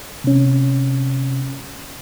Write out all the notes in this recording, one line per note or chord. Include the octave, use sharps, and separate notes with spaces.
C3 C#4